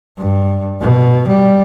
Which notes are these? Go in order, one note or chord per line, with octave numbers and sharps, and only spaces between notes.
G2
B2
G3